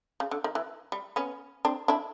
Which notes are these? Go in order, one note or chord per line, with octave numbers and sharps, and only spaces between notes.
C#3
D3
D#3
E3
G3
B3 C#4
C4 D4
D4 E4